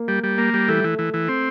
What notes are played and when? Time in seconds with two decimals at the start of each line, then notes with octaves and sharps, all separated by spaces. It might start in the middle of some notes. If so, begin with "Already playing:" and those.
Already playing: A#3
0.08 G3
0.24 G3
0.38 A#3
0.54 G3
0.68 E3 A3
0.84 E3
0.99 E3
1.14 E3
1.29 C4